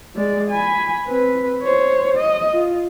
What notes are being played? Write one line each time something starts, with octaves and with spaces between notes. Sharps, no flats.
G#3 D5
G#5 B5
C4 B4
C5 C#5
D#5
F4